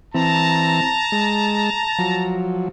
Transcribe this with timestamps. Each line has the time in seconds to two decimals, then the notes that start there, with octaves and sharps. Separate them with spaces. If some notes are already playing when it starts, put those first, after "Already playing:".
0.14 E3 C4 A5 A#5
1.12 G#3
1.98 F3 F#3